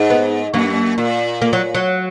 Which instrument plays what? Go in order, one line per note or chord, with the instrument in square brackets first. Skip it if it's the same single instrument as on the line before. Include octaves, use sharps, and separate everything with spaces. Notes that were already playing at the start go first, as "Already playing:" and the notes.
Already playing: [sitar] G#2
[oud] B3
[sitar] F#2 [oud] A#3
[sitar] A#2
[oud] A#3
F#3
F#3